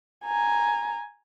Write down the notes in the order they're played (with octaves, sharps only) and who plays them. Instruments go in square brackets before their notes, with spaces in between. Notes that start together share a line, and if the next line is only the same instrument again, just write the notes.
[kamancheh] G#5 A#5